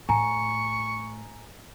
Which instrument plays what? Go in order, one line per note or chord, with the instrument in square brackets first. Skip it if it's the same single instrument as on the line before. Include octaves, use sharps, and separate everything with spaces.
[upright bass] A2 [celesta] G#5 A#5 [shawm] C#6